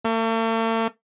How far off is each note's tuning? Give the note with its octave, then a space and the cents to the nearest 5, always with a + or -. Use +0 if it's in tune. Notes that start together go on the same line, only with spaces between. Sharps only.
A3 +45